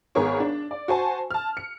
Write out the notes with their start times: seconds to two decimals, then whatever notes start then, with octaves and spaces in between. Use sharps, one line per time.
0.15 G#1 B3 G#4 A#4 C#5 C#6
0.40 D4
0.71 D5
0.88 F#4 C5 G#5 A5
1.31 A5 F6
1.57 C#7